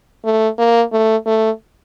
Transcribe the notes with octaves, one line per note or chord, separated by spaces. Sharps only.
A3
A#3
A3
A3